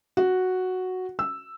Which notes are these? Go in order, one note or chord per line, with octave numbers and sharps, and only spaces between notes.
F#4
E6